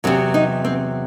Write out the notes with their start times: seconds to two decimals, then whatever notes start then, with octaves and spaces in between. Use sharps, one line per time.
0.04 E2 C3 D#3 F#3 C4
0.34 D#4
0.65 C4